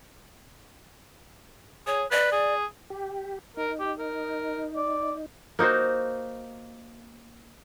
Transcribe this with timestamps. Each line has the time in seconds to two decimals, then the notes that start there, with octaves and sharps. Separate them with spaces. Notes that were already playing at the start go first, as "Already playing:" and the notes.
1.87 G#4 C#5
2.11 B4 D5
2.33 G#4
2.90 G4
3.57 D#4 A#4
3.80 G4
3.99 A#4
4.76 D5
5.59 A#3 D#4 F#4 C5